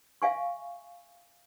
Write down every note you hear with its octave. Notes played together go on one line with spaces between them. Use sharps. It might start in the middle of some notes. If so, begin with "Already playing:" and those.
E5 F5 G#5 C#6